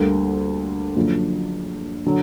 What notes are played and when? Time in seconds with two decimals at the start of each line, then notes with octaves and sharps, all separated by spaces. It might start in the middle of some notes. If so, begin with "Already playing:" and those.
Already playing: D2 D3 G3 A#3
0.96 F#1 F#2 D3 F3
2.06 D3 F#3